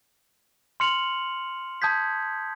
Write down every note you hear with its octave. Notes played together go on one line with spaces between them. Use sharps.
C6 F6 C#7 F7 F#7
A5 D#6 G6 G#6 B6